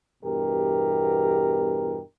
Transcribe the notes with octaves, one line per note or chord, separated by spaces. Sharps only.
E2 G2 B2 G4 A#4